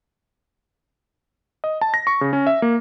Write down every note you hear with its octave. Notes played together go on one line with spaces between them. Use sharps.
D#5
A5
A#6
C#6
C#3
C#4
E5
A#3